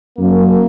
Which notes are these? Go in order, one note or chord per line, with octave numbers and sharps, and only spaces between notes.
F#2 A#3